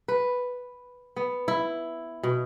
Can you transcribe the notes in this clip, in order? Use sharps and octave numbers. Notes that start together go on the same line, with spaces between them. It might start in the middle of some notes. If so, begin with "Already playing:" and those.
B4
B3
E4
B2